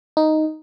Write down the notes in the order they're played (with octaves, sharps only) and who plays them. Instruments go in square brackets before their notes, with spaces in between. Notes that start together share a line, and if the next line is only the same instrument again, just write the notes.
[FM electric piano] D#4